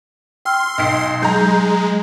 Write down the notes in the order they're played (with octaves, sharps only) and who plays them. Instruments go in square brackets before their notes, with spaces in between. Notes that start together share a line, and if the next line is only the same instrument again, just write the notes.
[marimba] G5 E6 F6 [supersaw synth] C6
[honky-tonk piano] B1 C7
[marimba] F#3 [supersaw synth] G#3 [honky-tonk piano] A#5 G6